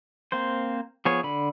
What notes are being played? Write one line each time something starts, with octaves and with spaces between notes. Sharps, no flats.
A#3 C4 C5
F3 B3 G#4 C#5
D3 B5